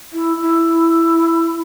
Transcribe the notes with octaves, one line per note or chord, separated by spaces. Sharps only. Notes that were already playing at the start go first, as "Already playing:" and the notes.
E4
E4